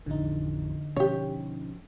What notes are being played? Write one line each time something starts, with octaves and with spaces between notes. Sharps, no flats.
A1 F2 D3 D#4
B2 F3 C#4 G4 C#5